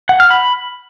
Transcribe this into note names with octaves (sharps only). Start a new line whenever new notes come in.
F#5
F6
B5